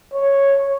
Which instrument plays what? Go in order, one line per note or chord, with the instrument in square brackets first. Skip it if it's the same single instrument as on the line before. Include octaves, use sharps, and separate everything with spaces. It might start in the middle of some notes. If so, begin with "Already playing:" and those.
[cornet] C#5